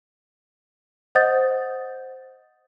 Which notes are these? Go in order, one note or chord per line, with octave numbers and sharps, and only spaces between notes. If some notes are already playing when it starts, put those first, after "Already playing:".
C5 D#5 F#5 D#6 G6 A6